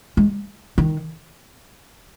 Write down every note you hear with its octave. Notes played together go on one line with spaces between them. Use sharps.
G#3
D#3